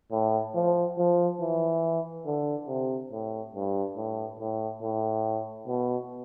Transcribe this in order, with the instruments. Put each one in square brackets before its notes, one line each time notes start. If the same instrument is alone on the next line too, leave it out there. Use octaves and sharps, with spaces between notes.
[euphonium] A2
F3
F3
E3
D3
C3
A2
G2
A2
A2
A2
B2